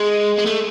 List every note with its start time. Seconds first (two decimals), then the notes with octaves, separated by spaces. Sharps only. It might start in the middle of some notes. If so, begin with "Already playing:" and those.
Already playing: G#3
0.38 G#3
0.46 A3